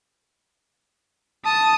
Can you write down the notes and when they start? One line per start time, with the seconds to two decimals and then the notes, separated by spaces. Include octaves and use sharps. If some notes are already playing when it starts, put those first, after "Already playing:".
1.45 A5 D#6